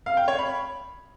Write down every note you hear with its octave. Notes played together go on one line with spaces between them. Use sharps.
F5
G5
C#5
B5